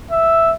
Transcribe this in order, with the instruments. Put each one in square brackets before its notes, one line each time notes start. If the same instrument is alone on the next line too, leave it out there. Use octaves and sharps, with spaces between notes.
[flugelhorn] E5